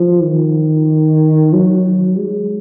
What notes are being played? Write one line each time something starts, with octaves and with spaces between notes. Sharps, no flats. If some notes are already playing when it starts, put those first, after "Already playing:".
Already playing: F3
D#3
F#3
G#3